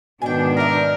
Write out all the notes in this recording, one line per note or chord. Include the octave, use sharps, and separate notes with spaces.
G#2 B2 D#3 B3 D4 G5 G#5
A#4 D5 E5